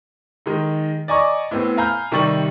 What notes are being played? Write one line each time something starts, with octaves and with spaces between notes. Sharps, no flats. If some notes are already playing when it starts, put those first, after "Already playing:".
D#3 G#3 D#4
D5 D#5 G#5 A#5 C#6 D6
A2 B3 C4
F5 G#5 A#5 B5 F6 G6
C3 D#3 G3 C#6 A6 F#7